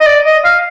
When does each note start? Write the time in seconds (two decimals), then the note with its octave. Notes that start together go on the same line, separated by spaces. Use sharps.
0.01 D#5
0.07 D5
0.25 D#5
0.44 F5